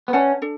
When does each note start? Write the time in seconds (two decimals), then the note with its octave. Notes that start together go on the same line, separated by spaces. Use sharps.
0.08 B3
0.13 C#4 B4 D5 F#5 A5
0.42 D4 A4